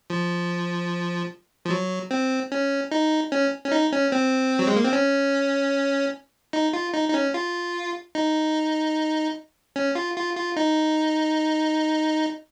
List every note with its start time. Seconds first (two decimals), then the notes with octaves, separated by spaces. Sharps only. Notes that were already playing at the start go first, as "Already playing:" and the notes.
0.10 F3
1.65 F3
1.70 F#3
2.11 C4
2.52 C#4
2.91 D#4
3.32 C#4
3.64 C#4
3.72 D#4
3.92 C#4
4.12 C4
4.59 F#3
4.67 G#3
4.76 A#3
4.84 C4
4.93 C#4
6.53 D#4
6.73 F4
6.94 D#4
7.08 D#4
7.14 C#4
7.34 F4
8.15 D#4
9.76 C#4
9.95 F4
10.16 F4
10.36 F4
10.56 D#4